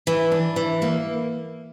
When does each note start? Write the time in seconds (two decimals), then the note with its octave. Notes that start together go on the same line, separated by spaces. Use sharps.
0.07 E3
0.32 D4
0.56 E3
0.82 A#3